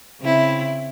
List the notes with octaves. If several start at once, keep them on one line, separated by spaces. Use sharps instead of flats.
C#3 C4 E4